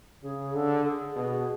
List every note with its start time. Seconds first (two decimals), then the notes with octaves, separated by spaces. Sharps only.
0.23 C#3 G#4
0.54 D3 A4
0.85 G#4
1.16 B2